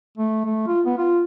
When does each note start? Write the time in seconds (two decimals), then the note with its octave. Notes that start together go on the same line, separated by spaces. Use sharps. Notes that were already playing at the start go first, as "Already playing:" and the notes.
0.18 A3
0.45 A3
0.67 F4
0.86 B3
0.98 F4